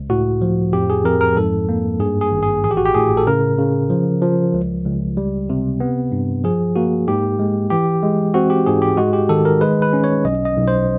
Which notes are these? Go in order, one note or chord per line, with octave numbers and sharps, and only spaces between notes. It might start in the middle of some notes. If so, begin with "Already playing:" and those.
Already playing: C#2
A2 F#4
F3
F2 G4
G#4
F2 A#4
A#4
G#2 A4
A#3
G2 G#4
G#4
G#1
G#4
A1 G#4
G4
F#4
G4
A2 G#4
A4
C#3 A#4
C#3
F3
F3
C#2
C#2
G3
C3
B3
G2
F3 G#4
A#3 F#4
G#2 G4
G#3
E3 G4
G#3
C4 F#4
G4
G#2 G#4
G4
G#3 F#4
G4
D#3 A4
A#4
G#3 B4
B4
C#4
C#5
B1 D#5
D#5
B1
C5